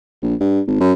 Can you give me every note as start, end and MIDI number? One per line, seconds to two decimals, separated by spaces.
0.22 0.35 34
0.40 0.61 43
0.67 0.76 32
0.80 0.93 42